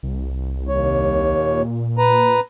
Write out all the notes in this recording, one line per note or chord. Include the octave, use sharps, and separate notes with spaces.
C2
D#2 C#5
A#2
B4 A#5